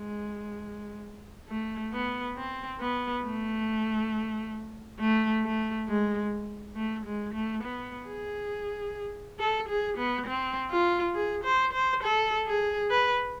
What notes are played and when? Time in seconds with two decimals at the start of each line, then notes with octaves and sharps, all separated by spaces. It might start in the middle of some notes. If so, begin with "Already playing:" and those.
Already playing: G#3
1.48 A3
1.92 B3
2.36 C4
2.80 B3
3.24 A3
5.00 A3
5.43 A3
5.88 G#3
6.76 A3
7.05 G#3
7.34 A3
7.63 B3
8.07 G#4
9.39 A4
9.68 G#4
9.98 B3
10.26 C4
10.71 F4
11.15 G#4
11.44 C5
11.73 C5
12.03 A4
12.47 G#4
12.90 B4